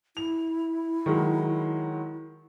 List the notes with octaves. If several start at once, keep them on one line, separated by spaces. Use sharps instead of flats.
E4 F7
D#3 F#3 G#3